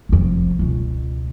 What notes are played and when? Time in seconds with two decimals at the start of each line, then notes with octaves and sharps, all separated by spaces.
0.09 F1 F2
0.59 C#2 B2